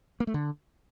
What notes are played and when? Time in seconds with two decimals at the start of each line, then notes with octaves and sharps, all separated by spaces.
0.20 A#3
0.27 A3
0.34 D3